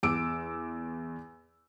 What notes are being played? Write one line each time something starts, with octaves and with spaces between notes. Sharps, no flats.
E2 D6 E6 D7